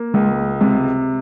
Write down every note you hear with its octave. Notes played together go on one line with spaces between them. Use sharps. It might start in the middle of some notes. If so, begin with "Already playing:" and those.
Already playing: A#3
C#2 G#3
C3 G#3